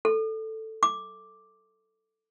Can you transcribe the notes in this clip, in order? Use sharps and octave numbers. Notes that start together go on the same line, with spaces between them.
A4
D6